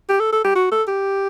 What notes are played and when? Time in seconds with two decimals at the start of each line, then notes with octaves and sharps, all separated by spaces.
0.09 G4
0.20 A4
0.32 A4
0.45 G4
0.56 F#4
0.72 A4
0.88 G4